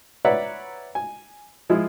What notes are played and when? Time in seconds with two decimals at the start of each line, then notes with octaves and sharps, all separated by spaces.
0.25 B4 C#5 D5 E5 F#5 A#5
0.95 G#5
1.70 F3 G#3 E4